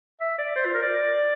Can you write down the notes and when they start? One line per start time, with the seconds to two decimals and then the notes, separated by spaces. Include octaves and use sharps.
0.21 E5
0.38 D5
0.56 C5
0.65 F4
0.74 A#4
0.83 D5